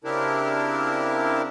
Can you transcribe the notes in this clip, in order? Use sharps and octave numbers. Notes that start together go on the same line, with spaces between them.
C#3 C4 D4 E4 G4 A#4